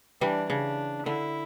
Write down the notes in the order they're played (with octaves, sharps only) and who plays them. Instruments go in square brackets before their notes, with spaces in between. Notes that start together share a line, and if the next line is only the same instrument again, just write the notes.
[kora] E3 G3 [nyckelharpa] D4
[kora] C#3 [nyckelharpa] D4
[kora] D3 [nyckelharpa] E4